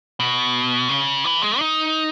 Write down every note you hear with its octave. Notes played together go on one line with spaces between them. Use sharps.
B2
C#3
E3
G#3
D#4